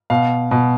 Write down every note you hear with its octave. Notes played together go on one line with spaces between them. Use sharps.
B2 F5
B2